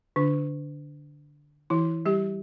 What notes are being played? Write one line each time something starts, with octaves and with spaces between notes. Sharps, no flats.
D3 D4
E3 E4
G3 G4